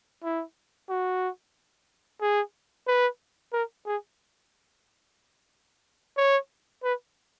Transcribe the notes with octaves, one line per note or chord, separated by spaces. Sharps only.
E4
F#4
G#4
B4
A#4
G#4
C#5
B4